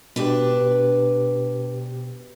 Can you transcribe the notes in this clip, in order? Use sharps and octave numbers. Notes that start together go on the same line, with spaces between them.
B2 D4 G4 B4